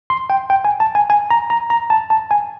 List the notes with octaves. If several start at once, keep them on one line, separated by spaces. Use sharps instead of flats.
C6
G5
G5
G#5
A5
G#5
G#5
A#5
A#5
A#5
A5
A5
G#5